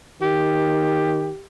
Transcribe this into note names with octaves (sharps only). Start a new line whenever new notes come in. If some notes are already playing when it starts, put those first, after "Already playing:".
D#3 G4